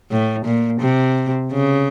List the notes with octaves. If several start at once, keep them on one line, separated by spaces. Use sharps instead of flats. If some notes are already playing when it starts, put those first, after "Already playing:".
A2
A#2
C3
C#3